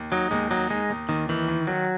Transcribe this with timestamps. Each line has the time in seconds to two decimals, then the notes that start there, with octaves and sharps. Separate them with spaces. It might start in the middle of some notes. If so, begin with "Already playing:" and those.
Already playing: D#2
0.12 F#3 D#4
0.31 D#2 G#3
0.51 F#3 D#4
0.70 G#3 D#4
0.90 D#2
1.09 D#2 D#3
1.29 D#3 E3
1.48 D#3
1.67 D#3 F#3